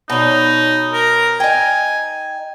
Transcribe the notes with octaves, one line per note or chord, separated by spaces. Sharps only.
B2 D#4 C#5
A#4
D#4 G5 G#5